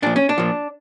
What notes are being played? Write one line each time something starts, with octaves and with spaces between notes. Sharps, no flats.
A#2 F3 D4
C#4
D4
A#2 F3